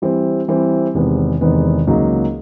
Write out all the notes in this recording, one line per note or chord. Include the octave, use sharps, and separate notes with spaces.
E3 G3 C4
E3 G3 C4
E2 C3 D#3 G#3 B3
E2 C3 D#3 G#3 B3
C#2 C#3 F#3 A#3 D#4